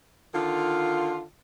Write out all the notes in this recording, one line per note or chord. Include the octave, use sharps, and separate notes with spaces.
D3 D#3 F4